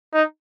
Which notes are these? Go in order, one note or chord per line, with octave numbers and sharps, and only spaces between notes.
D#4